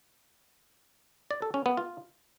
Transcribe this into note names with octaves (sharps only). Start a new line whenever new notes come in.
D5
A4
C#4
B3
F4